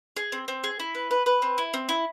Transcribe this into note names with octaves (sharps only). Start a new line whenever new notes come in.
G#4
C4
C4
G#4
E4
B4
B4
B4
C4
E4
C4
E4